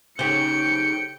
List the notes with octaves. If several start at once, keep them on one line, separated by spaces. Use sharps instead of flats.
C#3 D#4 G4 A4 C5 G5 C#7